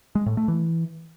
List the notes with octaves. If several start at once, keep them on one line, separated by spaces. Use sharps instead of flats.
G#3
A2
A3
E3